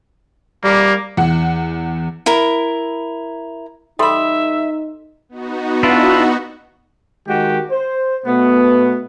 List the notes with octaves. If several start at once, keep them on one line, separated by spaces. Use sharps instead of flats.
G3 A#3
E2 F#5
E4 A#4
G3 D#4 A4 E5 B5 C6
B3 D#4 F#4
D4 E4 F4
D#3 G#3 F#4 G4
C5
B2 A3 B3